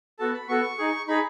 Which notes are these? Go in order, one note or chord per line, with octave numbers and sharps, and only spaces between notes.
B3 F#4 A4 A5
B5
B3 F#4 A4 C#6
D#4 G#4
D#4 G#4 B5